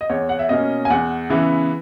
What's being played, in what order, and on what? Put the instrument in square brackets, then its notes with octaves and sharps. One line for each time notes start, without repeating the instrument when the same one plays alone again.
[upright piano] D#5
E2 C#5
F#5
E5
B2 A#3 C#4 D#5
G#5
E2 F#5
C#3 E3 B3 E4